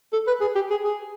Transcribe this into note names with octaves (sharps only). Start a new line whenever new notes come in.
A4
B4
G#4
G4
G#4
G#4